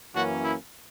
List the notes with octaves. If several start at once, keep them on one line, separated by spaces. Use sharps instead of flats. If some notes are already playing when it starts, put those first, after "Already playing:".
F#2 E3 A#3 C#4 F#4
E4